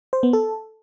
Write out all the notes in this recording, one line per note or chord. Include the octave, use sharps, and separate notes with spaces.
C5
B3
A4